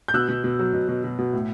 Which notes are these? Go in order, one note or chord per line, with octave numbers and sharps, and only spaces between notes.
G6
B2 E6 F#6
B2
B2
F#3
B2
B2
B2
B2
A2